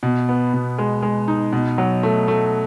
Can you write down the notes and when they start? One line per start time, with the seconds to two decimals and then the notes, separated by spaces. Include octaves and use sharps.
0.03 B2
0.29 B3
0.54 B2
0.78 G#3
1.03 G#3
1.28 D#4
1.53 B2
1.78 F#3
2.03 A3
2.28 A3